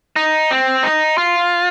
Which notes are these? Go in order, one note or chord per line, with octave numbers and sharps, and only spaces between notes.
D#4
C4
D#4
F4